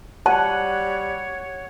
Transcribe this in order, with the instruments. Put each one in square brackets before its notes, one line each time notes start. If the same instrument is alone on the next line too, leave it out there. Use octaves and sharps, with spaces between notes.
[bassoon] G3 [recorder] C#5 [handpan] F#5 [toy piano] A5